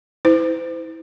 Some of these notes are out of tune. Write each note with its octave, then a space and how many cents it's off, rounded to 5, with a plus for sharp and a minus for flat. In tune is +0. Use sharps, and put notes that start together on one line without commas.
E4 -25 C5 -40